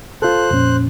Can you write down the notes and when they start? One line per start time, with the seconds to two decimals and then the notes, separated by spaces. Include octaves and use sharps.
0.22 F4 A4 C5 F#6
0.51 F2 A#2 C#4